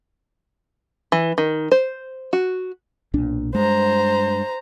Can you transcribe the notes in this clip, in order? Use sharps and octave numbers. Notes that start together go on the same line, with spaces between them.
E3
D#3
C5
F#4
B1 A#2 D4
G2 G#3 C5 A#5